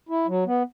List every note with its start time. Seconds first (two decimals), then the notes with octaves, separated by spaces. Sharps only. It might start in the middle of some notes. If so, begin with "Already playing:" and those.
0.09 E4
0.27 F#3
0.46 B3